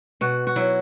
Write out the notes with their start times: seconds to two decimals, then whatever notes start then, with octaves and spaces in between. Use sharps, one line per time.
0.21 B2 F#4
0.47 F#4
0.56 F#3 E4